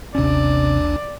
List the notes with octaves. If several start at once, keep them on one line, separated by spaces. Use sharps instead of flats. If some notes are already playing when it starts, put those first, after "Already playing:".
A1 D#2 C3 C#4 D4 D5